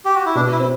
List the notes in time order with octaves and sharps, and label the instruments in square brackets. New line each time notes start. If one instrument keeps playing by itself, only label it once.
[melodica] G4
F#4
E4
[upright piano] B2 [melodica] D4
[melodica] E4
[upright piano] C4